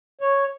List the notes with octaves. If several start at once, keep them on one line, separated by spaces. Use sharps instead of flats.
C#5